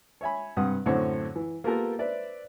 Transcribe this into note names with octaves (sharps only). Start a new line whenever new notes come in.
C#5 E5 G#5 B5
G2 C3 G3 F#5 D#6
F#2 A2 D3 C4 C5 C#5
E3
A#3 B3 F4 G4 A4 A#4
B4 C5 D5 E5